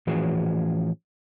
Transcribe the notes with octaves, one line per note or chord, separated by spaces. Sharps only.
A2 E3 F3 C#4 F#4 G#4